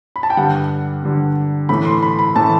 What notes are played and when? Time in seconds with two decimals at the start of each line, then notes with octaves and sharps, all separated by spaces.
0.16 B5
0.23 A5
0.30 G5
0.37 G2 D3 G3 F#5
1.03 G2 D3 G3
1.69 A2 E3 A3 B5
1.85 C6
2.03 B5
2.19 B5
2.36 A2 E3 A3 A5